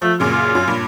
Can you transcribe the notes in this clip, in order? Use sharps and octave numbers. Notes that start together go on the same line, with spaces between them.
F3 A3
F#2 A#2 C#3 F4
F4
F#2
G2 A#2